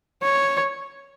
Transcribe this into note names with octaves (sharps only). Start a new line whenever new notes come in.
C#5